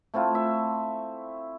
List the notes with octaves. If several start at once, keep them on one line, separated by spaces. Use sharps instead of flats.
A3 C4 E4 F4
E5